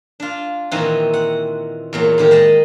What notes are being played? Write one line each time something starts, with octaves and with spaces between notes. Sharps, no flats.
D4 F4
A#2 D#3 E3 C4 D#4 F#4
F#5
E2 A#2 F#3
A2 D#3 G4
G#3 D#5 A5